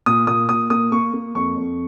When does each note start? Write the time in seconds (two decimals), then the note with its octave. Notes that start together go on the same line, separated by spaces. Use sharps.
0.06 A#2 D#6
0.27 A#2 D#6
0.49 A#2 D#6
0.70 A#3 D#6
0.92 A#3 C#6
1.13 A#3
1.35 F2 C#6
1.56 F2